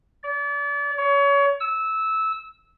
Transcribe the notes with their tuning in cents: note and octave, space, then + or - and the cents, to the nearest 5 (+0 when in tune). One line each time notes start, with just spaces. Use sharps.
D5 -35
C#5 +25
E6 -15